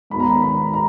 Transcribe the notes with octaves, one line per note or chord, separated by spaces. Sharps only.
G#2 D#3 F#3 B3 B5
A#5
B5
B5
A#5